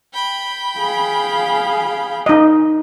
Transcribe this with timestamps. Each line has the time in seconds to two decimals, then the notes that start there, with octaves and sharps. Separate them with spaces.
0.14 G5 B5
0.78 G#4 F5
2.26 D#4 D#5